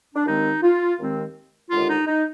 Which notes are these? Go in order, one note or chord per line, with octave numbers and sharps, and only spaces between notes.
D4
D#2 D#3 G#3 C4 D#4
F4
D#2 D#3 G#3 C4
D#2 D3 G#3 F4
D#4
D#4